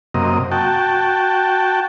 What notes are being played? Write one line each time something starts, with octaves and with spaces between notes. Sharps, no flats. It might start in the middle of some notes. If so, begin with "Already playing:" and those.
F#2 C3 A#3 D#5
F#4 G5 A5